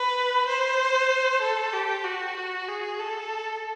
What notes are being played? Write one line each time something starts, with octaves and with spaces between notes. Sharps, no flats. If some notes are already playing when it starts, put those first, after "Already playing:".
Already playing: B4
C5
A4
G4
F#4
F#4
G#4
A4